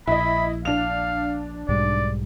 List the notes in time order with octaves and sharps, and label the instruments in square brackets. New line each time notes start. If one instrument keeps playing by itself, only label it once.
[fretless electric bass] A#1 [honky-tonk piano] E4 D#5 [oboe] B5
[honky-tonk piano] D4 F7 [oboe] F5
[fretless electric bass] B1 G#2 G3 [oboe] D5